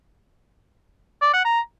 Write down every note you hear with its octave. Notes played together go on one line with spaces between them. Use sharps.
D5
F#5
A#5